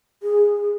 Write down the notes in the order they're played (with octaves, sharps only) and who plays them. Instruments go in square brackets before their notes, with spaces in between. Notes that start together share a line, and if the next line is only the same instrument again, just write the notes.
[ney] G#4